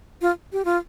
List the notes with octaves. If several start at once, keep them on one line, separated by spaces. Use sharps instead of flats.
F4
G4
F4